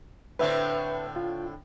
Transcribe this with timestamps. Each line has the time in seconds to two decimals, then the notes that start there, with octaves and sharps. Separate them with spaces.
0.39 A2 D3 C4 B4 E5
1.16 F4